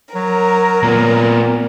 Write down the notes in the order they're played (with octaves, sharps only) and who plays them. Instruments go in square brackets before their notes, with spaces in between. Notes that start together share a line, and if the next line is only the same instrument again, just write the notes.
[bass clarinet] F#3 [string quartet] A#4
[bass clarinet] A#2 [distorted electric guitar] A#3 B3